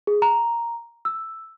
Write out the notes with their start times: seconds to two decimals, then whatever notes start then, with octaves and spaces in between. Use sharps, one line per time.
0.07 G#4
0.22 A#5
1.05 E6